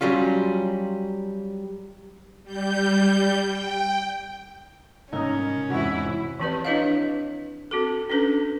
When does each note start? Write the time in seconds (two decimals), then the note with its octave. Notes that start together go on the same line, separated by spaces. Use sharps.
0.01 F#3 G3 C#4 F4
2.43 G3 G6
3.46 G5
5.13 C2 G#2 C#4 D#4 A#4
5.70 E2 G#2 C3 E4 F#4 E5
6.40 E3 F3 C4 G4 B4 D5
6.65 D4 E4 B4 C#5 D#5 F5
7.71 C4 F#4 A4
8.10 C#4 D4 A4 B4